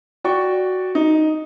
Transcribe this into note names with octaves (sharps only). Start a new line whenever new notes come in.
F#4 D5 G5 C#6
D#4